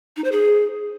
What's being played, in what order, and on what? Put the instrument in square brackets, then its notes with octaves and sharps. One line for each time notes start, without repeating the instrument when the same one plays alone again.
[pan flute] D#4
C5
G#4